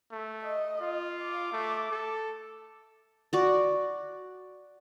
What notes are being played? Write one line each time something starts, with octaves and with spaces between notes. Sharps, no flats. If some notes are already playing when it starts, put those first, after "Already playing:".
A3
D#5
F4
D6
A3
A4
F#4 D5